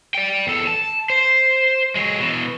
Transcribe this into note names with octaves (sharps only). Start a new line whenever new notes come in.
D5 G5
E2 A4
A5
C5
F#3 G#3
B2 E3